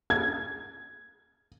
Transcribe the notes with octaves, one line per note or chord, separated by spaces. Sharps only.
G#6